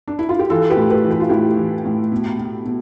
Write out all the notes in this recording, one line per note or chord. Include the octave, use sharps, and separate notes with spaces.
D4
E4
F4
G4
E3 F4 A4
G4 B4
A2
G4 B4
E3
G4
F4
A2 E4 G4
E3
A2
B2
B2
B2